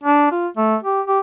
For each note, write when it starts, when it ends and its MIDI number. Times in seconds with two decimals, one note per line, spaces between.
0.03 0.31 62
0.32 0.47 65
0.57 0.76 57
0.83 1.01 67
1.07 1.20 67